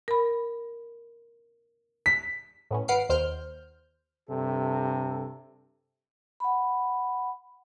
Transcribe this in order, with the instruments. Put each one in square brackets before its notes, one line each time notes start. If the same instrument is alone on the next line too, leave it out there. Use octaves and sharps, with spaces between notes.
[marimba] A#4 B5
[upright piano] B6
[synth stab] A2 B3 C#4
G#1 B4 F#5 F6 C7 D7
D#2 C5 F6 G6
[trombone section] G2 C3 A4
[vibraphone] F#5 B5